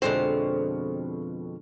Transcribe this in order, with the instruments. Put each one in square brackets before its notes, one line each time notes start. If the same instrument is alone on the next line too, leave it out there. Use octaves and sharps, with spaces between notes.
[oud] F2 B2 [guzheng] D3 G#3 C4 [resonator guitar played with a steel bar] C5